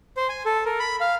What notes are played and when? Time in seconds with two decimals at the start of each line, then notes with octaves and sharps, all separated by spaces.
0.17 C5
0.29 G#5
0.45 A4
0.66 A#4
0.80 B5
1.00 F5